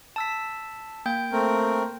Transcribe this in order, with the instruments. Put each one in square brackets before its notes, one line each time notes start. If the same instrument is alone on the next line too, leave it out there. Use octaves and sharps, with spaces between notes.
[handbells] A5 E6 B6
A#3 G5 G6
[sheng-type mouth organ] A3 C4 A#4